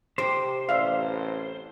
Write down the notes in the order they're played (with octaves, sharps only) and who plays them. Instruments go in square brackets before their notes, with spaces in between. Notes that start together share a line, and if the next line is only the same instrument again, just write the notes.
[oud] C3 D#4 G4 [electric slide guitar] C5
[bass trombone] A1 [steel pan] D5 E5 F5